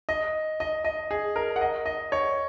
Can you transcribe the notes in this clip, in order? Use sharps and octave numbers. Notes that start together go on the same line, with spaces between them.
D#5
D#5
D#5
G#4
A#4
F#5
D#5
D#5
C#5